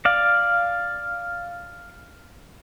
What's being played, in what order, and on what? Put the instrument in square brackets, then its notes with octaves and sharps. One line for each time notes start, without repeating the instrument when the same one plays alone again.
[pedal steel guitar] D5 F5